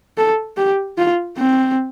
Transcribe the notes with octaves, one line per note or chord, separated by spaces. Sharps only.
A4
G4
F4
C4